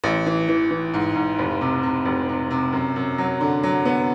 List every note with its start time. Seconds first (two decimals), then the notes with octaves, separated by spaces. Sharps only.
0.04 A1
0.26 E3
0.48 E3
0.70 E3
0.94 G#2
1.15 G#2
1.39 F1
1.61 C3
1.83 C3
2.05 F1
2.29 C3
2.50 C3
2.73 F#2
2.96 F#2
3.18 F#3
3.41 D3
3.63 F#3
3.85 B3